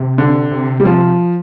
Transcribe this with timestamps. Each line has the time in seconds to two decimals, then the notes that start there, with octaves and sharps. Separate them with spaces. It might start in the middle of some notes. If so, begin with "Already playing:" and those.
Already playing: C3
0.18 D3
0.51 C3
0.80 G3
0.85 F3